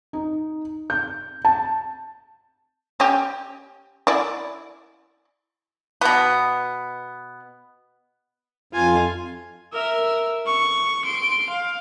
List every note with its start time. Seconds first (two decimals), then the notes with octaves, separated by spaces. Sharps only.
0.13 D#4
0.90 G6
1.45 A5
3.00 C#4 G4
4.07 E4 D5
6.01 B2 B3
8.73 F2 F4 G#5
9.73 A#4 E5
10.46 C#6
11.04 C6 D7
11.50 F5